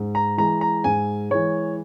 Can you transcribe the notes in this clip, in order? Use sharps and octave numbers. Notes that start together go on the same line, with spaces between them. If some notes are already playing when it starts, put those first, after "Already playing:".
Already playing: G#2
A#5
E3 G#3 A#5
A#5
G#2 G#5
E3 G#3 C#5